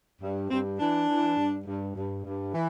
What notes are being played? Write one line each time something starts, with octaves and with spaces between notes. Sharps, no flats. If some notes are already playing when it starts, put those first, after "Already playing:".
G2
G2 C4
E3 D4
E3
G2
G2
G2
G2
E3